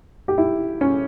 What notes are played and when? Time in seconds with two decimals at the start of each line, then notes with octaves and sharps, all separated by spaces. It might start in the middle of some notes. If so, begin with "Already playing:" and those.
0.28 G4
0.38 E4
0.81 C#4